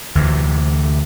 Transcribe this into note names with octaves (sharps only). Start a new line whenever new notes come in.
D2 C3 E3